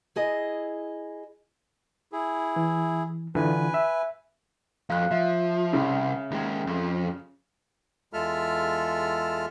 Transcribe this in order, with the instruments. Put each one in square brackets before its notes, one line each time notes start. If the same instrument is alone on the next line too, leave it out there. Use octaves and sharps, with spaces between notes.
[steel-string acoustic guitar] E4 G#4 D#5
[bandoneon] E4 G#4
[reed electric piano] E3
[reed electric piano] D3 E3 F4 [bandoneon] B4 G#5
[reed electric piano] E5
[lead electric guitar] F2 [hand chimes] F5 F#6
[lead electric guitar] F3 [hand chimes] E5
[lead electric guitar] C2 [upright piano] C#3
[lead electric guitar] D#2 G#3
F2
[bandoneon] E2 G#3 F4 A4 E5 F6